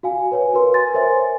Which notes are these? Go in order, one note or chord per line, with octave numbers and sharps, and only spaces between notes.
F#4 F5 G#5
B4 C#5 G#5
F#4 A#4 B4 C6
G#5 C6 A6
A#4 C5 C#5 E5 G#5